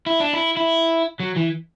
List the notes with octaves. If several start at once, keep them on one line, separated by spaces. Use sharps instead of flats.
E4
D4
E4
E4
F#3
E3